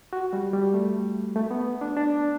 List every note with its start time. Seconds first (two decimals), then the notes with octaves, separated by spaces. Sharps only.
0.13 F#4
0.33 G3
0.53 G3
0.74 A3
1.36 A3
1.51 B3
1.81 D4
1.97 D4